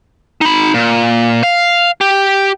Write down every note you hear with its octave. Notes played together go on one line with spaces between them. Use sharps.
D#4 B5
A#2
F5
G4